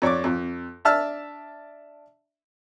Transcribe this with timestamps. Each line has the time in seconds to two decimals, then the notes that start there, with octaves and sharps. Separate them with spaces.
0.02 F2 C#5 D5 D6
0.24 F2
0.85 D4 E5 A5 E6 F6